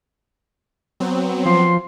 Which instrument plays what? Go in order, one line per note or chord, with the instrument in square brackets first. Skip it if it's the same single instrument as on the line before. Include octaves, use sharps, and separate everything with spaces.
[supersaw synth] F#3 B3 C4
[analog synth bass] F3 [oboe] C6